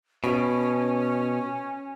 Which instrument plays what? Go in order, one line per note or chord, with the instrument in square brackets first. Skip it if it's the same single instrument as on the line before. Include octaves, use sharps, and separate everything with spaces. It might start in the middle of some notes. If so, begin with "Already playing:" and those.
[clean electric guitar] B2 [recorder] C#4